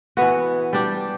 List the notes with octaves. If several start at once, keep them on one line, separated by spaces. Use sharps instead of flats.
E3 B3 F#4
G3 D4 G4